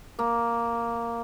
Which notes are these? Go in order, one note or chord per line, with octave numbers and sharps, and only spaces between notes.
A#3